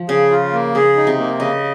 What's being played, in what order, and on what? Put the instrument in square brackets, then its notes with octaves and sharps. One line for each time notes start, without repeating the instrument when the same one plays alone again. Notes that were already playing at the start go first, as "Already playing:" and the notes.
Already playing: [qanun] F3
[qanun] C#3 [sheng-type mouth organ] G#4
[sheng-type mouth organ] F4
A#3
[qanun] C#3 [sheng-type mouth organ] G#4
[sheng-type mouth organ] D#4
[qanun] C3
[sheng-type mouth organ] A#3
[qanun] C#3 [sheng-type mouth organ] D#5